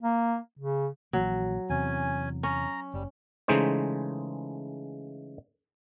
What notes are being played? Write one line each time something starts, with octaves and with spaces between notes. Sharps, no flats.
A#3
C#3
A#1 E3 F#3 A#3
E2 C3 C#4 G#5
C#4 A#5
F#1 G3
C#3 E3 G#3 A3 D#4 C5